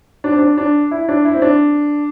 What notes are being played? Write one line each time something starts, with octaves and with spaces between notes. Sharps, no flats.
D4
C4
D4
D4
E4
D4
E4
C4
D4